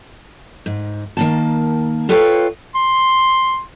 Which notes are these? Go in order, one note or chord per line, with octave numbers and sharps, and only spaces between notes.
G#2
D#3 A#3 A5
F4 A4 B4 C#5 F5 G5
C6